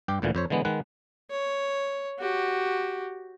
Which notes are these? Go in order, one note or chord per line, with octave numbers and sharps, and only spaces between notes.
G2 G4 G5
D2 A#2 D3 E3
F2 C5 C#5
D3 E3 G#3 B3
D#3 G#3 B4 F#5
C#5
F#4 G4